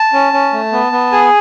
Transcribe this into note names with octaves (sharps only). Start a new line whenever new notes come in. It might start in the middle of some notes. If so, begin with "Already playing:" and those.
Already playing: A5
C#4
C#4
A3
B3
B3
G#4 G#5